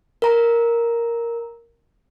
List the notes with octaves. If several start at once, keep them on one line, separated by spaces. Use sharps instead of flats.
A#4 A#5